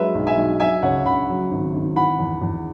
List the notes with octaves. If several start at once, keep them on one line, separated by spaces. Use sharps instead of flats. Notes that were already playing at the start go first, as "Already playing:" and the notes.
Already playing: F#3 G#3 B4 E5
B1
E5 G#5
B1
F#3 E5 G#5
C#2 C#5 F#5
C#2 F#5 B5
F#3
G#1
G#1
E3 F#5 B5
E2
E2